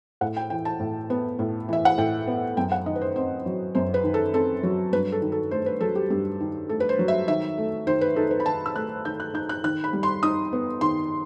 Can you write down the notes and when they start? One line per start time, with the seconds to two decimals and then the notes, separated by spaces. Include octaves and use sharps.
0.21 A2 F#5
0.37 G5
0.50 E3 G5
0.65 A5
0.80 A2
1.10 B3
1.39 A2
1.69 E3 E5
1.85 F#5
1.98 A2 G5
2.27 B3
2.57 F#2 G5
2.72 F#5
2.86 D#3 D#5
2.96 B4
3.02 C5
3.16 C4 C5
3.46 F#3
3.75 F#2 C5
3.94 B4
4.04 D#3
4.14 A4
4.33 C4 A4
4.63 F#3
4.93 G2 B4
5.12 A4
5.22 D#3
5.32 A4
5.51 A3 C5
5.66 B4
5.81 F#3 A4
5.96 G4
6.10 G2 G4
6.40 D#3
6.69 A3 A4
6.80 B4
6.89 C5
6.99 F#3
7.08 E5
7.28 D#3 E5
7.58 A3
7.87 D#3 C5
8.01 B4
8.16 D#4 A4
8.31 B4
8.40 B5
8.46 D#3 A5
8.66 E6
8.76 A3 F#6
9.05 D#3 G6
9.20 F#6
9.34 D#4 G6
9.49 F#6
9.64 D#3 F#6
9.84 B5
9.93 G3
10.03 C6
10.23 D#4 D#6
10.53 B3
10.81 D#3 C6